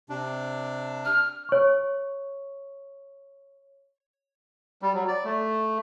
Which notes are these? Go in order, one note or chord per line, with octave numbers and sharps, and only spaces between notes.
C3 D4
F6
C#5 C#6
G3
F#3
D5
A3